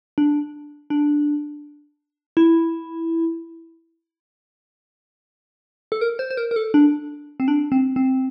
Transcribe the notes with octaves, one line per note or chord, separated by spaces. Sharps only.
D4
D4
E4
A4
A#4
C5
C5
A#4
A#4
A4
D4
C4
D4
C4
C4